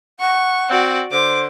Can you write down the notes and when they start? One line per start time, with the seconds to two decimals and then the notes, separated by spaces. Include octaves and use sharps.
0.20 F#5 C#6
0.70 C4 F#4 D5
1.12 D3 C5 D6